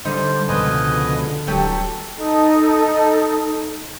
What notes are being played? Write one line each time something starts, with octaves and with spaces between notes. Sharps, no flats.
D3 G3 D#4 C5
C#2 B2 F3 B4 D#5 G#5
D1 F#3 G4 A4 B4
D#4 A4